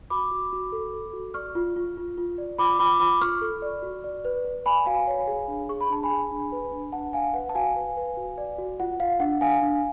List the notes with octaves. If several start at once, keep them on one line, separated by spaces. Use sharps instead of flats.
F#4 B5 D6
F#4
F#4
A4
A4
F#4
D5 C#6 F6
F4
F4
F4
F4
D5
F4 B5 D6
F4 B5 D6
F4 B5 D6
F4 C#6 F6
A4
D5
F#4
D5
B4
B4
D5 G#5 B5
F#4 F5 G#5
C#5
G#4
D4
G#4 C#6
B5
D4 A5
G#5 B5
G#4
D4
B4
D4
D4 F#5 A5
D4 F5 G#5
B4 F#5
A5
F#4 F5 G#5
B4
B4
F#4
D5
F#4
F4 F#5
F4 F5
D4 F#5
D4 F5 G#5
D4